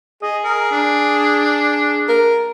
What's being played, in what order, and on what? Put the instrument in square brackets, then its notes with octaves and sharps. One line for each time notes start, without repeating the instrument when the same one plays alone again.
[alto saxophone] G#4 [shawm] D#5
[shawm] A#4
D4
[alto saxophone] A#4